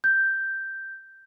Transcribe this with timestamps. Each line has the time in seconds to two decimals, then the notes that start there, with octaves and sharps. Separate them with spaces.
0.04 G6